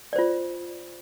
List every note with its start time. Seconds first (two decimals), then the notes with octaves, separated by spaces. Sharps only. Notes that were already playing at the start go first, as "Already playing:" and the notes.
0.13 D5
0.16 C5
0.19 F4